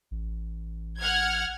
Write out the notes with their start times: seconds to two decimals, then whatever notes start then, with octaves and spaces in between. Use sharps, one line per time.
0.11 A1
0.99 F#5 F6 G#6